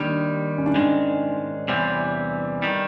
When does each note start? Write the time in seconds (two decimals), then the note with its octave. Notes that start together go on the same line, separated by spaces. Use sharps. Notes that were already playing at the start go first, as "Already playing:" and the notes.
Already playing: D#2 D#3 G3 D4
0.58 C#4
0.66 D4
0.75 G#2 D#3 G#3 D#4
1.68 E2 C3 E3 G3
2.62 D#3 G3